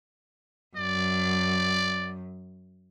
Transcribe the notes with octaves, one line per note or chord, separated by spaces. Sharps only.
F#2 D5